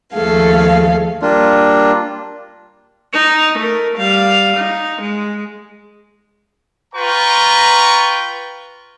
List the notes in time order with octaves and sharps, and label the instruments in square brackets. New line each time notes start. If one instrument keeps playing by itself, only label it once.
[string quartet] D#2 F3 A3 G#4 A4 F5
[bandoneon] G3 A#3 D4 F4
[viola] D#4
A3 A#4
G3 F5
D#4
G#3
[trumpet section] F4 B4 G5 A#5 C#6